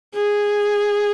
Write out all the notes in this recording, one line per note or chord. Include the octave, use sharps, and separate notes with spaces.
G#4